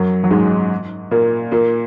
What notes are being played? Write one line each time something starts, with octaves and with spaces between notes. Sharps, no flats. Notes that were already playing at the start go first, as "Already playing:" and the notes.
Already playing: F#2 F#3
F#3
G#2 G#3
A#2 A#3
A#2 A#3